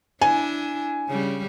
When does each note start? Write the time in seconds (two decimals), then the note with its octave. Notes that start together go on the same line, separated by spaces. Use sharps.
0.21 D4 E4 G#5
1.08 C#3 G3